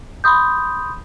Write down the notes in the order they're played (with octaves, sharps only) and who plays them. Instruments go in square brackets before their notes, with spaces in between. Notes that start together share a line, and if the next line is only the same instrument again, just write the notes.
[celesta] B5 C6 D#6 G6